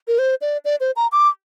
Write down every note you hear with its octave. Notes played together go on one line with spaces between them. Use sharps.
A#4
C5
D5
D5
C5
A#5
D6